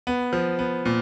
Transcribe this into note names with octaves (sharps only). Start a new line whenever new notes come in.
B3
F3
B3
A#2